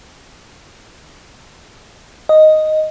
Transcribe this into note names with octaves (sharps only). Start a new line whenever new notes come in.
D#5